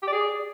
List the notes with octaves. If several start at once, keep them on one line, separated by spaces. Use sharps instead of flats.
G4
D5
G#4